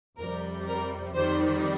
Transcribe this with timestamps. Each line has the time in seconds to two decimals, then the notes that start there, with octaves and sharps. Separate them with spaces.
0.18 F2 C3 G3 A#4
0.67 A#4
1.15 F2 D#3 G3 C5